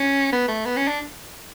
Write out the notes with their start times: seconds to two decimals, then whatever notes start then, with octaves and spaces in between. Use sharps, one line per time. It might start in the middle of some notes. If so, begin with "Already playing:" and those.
Already playing: C#4
0.32 B3
0.48 A3
0.65 B3
0.76 C#4
0.87 D4